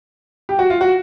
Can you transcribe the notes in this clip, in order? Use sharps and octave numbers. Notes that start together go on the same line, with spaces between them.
G4
F#4
F4
F#4